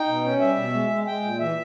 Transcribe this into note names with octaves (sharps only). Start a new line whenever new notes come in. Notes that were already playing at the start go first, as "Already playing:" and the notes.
Already playing: D#4 G5
B2
C#4
G3 E5
B2
G#3
G#3
G#3 G5
A#2
E3 E5